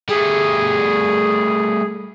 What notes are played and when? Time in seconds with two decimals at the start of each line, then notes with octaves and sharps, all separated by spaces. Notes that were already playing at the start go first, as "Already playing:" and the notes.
0.09 G3 A3 G#4